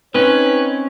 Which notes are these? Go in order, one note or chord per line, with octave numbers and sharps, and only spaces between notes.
C4 C#4 D#4 B4 C#5